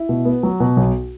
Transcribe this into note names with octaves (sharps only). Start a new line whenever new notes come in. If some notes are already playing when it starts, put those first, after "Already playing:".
Already playing: E4
B2
B3
F#3
B2
B1